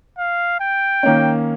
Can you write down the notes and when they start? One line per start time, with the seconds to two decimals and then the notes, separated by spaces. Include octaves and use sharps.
0.18 F5
0.60 G5
1.03 D#3 A#3 C#4